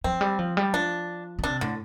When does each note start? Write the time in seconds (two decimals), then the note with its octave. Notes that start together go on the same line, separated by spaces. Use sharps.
0.04 F3 C4
0.21 G3
0.39 F3
0.57 G3
0.73 F3 D4
1.39 D3
1.44 C3 D4
1.61 A2 D3